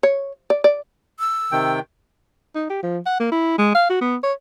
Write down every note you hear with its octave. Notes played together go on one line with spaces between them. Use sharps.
C#5
D5
D5
E6
C3 D#3 G5
D#4
G4
F3
F#5
A#3
E4
G#3
F5
F#4
B3
C#5